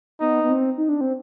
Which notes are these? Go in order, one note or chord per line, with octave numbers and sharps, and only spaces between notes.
B3 D#4
B3
C4
D#4
D4
C4